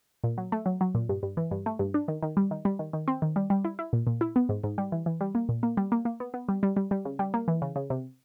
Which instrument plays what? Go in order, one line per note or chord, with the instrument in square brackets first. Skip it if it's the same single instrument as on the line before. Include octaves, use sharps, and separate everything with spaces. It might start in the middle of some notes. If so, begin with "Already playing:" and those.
[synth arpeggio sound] A#2
F#3
A3
F#3
F#3
A#2
G2
G2
E3
G2
A3
G2
D4
D#3
D#3
G3
D#3
G3
D#3
D#3
C4
D#3
G3
G3
E4
E4
A#2
A#2
E4
B3
G#2
G#2
G3
E3
E3
G3
A#3
A#2
A#3
G3
A#3
A#3
B3
B3
G3
G3
G3
G3
C#3
G3
A#3
E3
C#3
C#3
C3